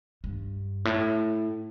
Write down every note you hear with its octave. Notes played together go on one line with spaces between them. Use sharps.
G2
A2